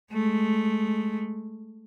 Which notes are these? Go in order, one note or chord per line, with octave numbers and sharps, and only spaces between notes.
G#3 A3